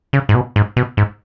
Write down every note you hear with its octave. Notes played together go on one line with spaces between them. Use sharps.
C#3
G#2
B2
G#2
B2
G#2